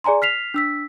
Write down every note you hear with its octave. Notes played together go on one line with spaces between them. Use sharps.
G#4 D5 G#5 A#5 C6
F6 B6 C7 F7
D4 E6 B6